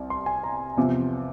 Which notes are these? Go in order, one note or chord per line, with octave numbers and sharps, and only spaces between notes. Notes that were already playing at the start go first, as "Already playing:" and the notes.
Already playing: C2
C6
G#5
A#5
E2 C3 F3